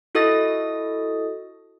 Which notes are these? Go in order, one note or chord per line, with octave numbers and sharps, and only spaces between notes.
E4 F#4 A4 D#5 D#6 A6